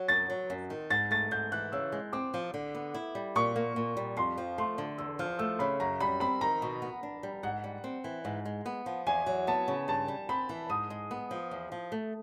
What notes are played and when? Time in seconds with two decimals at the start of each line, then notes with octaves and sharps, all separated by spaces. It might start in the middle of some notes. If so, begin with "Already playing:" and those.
Already playing: F#3
0.08 F#2 A6
0.30 F#3
0.50 F#2
0.70 D#3
0.90 G#2 A6
1.11 A3 A6
1.31 G#2 G6
1.52 E3 F#6
1.72 C#3 E6
1.92 G#3
2.13 C4 D6
2.34 F3
2.54 D3
2.74 B3
2.94 E4
3.15 G3
3.36 A#2 C#6
3.56 A#3
3.76 A#2
3.97 G3
4.17 F2 C6
4.38 F3
4.58 A3 C6
4.78 D3
4.98 E2 E6
5.19 F3 F6
5.39 A3 E6
5.59 C#3 B5
5.80 F#2 A#5
6.00 G3 B5
6.20 C4 B5
6.41 D#3 A#5
6.62 B2
6.82 B3
7.03 D4
7.23 G3
7.43 G#2 F#5
7.64 G3
7.84 C4
8.04 E3
8.25 G#2
8.45 G#3
8.66 B3
8.86 F3
9.07 E2 G#5
9.26 F#3
9.47 B3 A5
9.68 C#3
9.88 G2 A5
10.08 G3
10.29 C4 B5
10.49 E3
10.70 G#2 D#6
10.90 G#3
11.11 B3
11.31 F3
11.51 E2
11.72 F3
11.92 A3